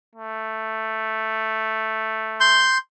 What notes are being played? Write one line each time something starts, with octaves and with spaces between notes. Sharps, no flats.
A3
C6 G6